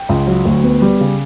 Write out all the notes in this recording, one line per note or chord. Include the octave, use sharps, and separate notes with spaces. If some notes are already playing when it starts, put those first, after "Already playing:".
Already playing: G5
C#2
F#3
D2
B3
G3
C#3